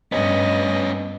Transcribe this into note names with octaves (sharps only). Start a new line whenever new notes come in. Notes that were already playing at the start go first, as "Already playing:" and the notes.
G2 B3 C#4 D#5